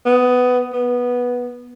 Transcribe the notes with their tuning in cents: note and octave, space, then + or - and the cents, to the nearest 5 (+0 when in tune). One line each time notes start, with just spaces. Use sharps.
B3 +15
B3 -10